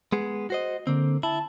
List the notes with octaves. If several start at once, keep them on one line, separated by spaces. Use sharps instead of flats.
G#3 B3 G#4
F#4 C5 D#5
D3 A#3 C4
E4 A5